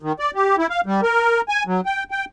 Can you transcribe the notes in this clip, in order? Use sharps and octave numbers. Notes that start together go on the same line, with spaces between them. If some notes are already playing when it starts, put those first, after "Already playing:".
D#3
D5
G4
E4
F5
G3
A#4
G#5
F#3
G5
G5